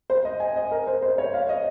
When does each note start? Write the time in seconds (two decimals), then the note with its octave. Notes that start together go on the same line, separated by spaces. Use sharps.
0.10 C5
0.25 D#5
0.40 G#5
0.56 D#5
0.71 A#4
0.87 C5
1.02 C5
1.18 C#5
1.34 F5
1.49 D#5